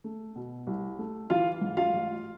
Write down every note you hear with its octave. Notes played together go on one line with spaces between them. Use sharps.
A3
B2
C2
A3
E3 F4 F5
G#2
F4 F5
A1